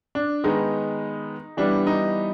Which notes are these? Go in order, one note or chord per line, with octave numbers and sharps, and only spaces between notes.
D4
D#3 G#3 B3 D#4
E3 G3 B3 D4
D#4